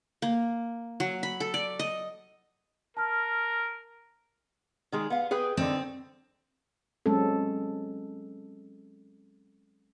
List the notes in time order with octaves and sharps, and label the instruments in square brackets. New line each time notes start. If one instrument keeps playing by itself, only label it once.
[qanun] A#3
F#3
B5
A4
D5
D#5
[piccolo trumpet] A#4 [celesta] A5 F6
[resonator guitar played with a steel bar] D#3 G#3 G#4
B3 F5
G#4 B4 G5
[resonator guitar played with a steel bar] D3 D#3 [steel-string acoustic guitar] C4
[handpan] F#3 G#3 C4 C#4 A4